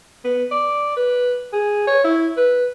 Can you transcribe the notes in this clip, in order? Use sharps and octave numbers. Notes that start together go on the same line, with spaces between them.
B3
D5
B4
G#4
C#5
E4
B4